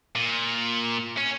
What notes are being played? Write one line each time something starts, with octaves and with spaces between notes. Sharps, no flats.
A#2
C#4